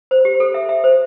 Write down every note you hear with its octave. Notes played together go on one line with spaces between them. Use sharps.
C5
G4
A4
E5
E5
C5